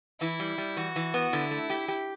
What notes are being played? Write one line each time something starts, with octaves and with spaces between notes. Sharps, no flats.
E3 E4
G3
G3
E3 F#4
E3
B3
D3 E4
A3
G4
G4